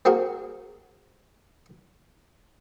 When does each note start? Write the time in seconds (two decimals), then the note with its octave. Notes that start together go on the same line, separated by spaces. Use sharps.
0.05 A#3 C4 F#4 G#4 A#4